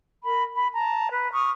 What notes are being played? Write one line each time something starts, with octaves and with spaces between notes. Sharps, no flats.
A#4 B5
B5
A5 A#5
B4
C#6 D#6 F6